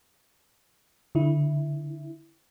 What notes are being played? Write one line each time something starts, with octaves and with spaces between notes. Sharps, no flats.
D3 E4